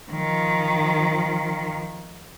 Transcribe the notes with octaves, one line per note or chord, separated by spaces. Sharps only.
D#3 F3